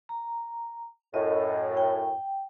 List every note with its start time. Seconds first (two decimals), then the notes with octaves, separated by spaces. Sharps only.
0.09 A#5
1.14 F#2 A2 D#5
1.77 G5